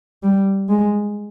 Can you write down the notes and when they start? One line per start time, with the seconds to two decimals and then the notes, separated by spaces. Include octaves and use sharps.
0.23 G3
0.69 G#3